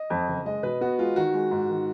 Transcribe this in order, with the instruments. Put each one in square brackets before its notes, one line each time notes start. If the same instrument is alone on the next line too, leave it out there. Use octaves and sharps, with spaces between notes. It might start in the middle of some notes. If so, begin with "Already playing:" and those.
Already playing: [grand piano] D#5
[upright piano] F2
F#1
[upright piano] G#3 [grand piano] D#5
[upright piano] B2 [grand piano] B4
[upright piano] B3 [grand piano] F#4
[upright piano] G#3 [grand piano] F4
[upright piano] D#3 [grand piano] F#4
[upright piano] G#3
G#2
D#3